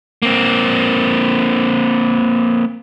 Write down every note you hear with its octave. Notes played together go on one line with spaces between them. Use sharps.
A#3 C4